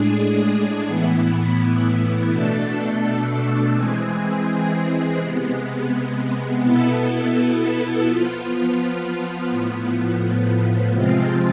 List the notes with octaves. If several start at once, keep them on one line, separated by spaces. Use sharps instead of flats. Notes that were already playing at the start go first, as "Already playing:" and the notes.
Already playing: A2 G#3 D4 G#4
A2 E3 B3 E4
B2 A3 D4 A4
E3 G#3 C4 G#4
C3 G#3 B3
B2 B3 E4 A4
F3 B3 F4
A2 F3 B3
C3 F3 G#3 C4 F4